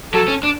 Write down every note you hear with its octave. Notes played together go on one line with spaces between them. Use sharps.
F#3 A4
C#4
D4